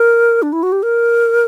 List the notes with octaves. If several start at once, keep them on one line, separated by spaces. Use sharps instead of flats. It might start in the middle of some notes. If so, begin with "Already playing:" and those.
Already playing: A#4
D4
E4
F#4
G4
A#4